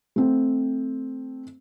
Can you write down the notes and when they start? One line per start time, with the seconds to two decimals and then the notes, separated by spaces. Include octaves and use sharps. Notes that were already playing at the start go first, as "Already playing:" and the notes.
0.16 A3 C4